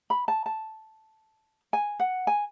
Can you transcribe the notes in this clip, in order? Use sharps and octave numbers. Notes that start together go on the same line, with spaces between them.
B5
A5
A5
G#5
F#5
G#5